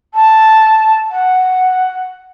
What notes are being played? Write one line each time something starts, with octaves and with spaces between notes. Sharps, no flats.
A5
F#5